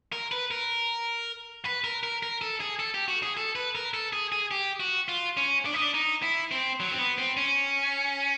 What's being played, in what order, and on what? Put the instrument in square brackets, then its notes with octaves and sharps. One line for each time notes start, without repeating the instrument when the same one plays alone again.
[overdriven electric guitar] A#4
B4
A#4
B4
A#4
A#4
A#4
A4
G#4
A4
G4
F#4
G#4
A4
B4
A#4
A4
G#4
G#4
G4
F#4
F4
C#4
D4
D#4
D4
D#4
E4
C4
F#3
C4
B3
C4
C#4